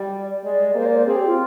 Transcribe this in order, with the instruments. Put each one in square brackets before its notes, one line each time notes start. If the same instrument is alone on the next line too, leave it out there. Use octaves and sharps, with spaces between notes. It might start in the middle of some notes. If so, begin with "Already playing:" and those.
Already playing: [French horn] G3 [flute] D5
[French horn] G#3 [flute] D5
[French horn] A#3 [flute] C5
[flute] D5
C5
[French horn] C4 [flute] G#4
[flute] G4
F4